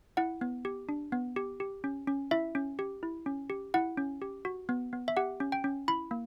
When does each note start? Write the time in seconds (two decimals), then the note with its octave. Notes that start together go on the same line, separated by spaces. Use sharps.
0.17 E4 F#5
0.41 B3
0.65 G4
0.89 D4
1.12 B3
1.36 G4
1.60 G4
1.84 C#4
2.07 C#4
2.31 E4 E5
2.55 C#4
2.79 G4
3.03 E4
3.26 C#4
3.50 G4
3.74 E4 F#5
3.97 C#4
4.22 G4
4.45 F#4
4.69 B3
4.93 B3
5.08 E5
5.17 G4 F#5
5.40 C#4
5.52 G5
5.64 C#4
5.88 E4 B5
6.11 A#3